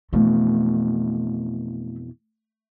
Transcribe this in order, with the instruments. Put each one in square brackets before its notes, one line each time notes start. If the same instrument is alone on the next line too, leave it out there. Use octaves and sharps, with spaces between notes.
[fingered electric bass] F2 B2 E3 [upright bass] A3